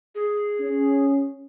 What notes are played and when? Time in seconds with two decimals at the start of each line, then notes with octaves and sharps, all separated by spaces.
0.15 G#4
0.61 C#4